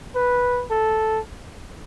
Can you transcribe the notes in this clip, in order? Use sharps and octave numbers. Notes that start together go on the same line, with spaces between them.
B4
A4